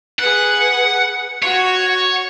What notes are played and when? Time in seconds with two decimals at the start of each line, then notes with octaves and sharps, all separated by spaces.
0.19 G#4 B4 F#5
1.42 F#4 C#5